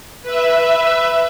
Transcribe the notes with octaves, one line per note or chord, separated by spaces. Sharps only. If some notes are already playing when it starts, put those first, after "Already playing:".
B4 E5